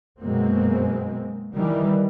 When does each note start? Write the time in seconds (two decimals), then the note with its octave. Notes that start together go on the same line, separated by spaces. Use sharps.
0.22 F#2 B2 F#3 G#3 A#3 C4
1.56 D#3 E3 G3